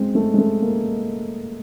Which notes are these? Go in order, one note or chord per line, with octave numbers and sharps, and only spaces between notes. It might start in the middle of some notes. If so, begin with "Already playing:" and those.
Already playing: G#3 C4
A3
G#3
A3
A#3